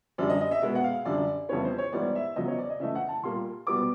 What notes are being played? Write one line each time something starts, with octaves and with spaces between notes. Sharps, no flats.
F#2 D3 G3 D5
D#5
D#5
E5
B2 G#3 B3
F#5
F5
F#2 D3 G3 D5
F2 C#3 E3 G3 B3 C#5
C5
C#5
G#2 E3 G3 B3 D5
E5
E2 C#3 F#3 D#5
C#5
D5
D#5
C#3 E3 A3 E5
F#5
A5
A#2 G3 A#3 C6
B2 G3 B3 D6